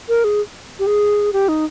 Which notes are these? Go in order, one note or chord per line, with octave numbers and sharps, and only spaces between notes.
A#4
G#4
G4
G#4
G4
D#4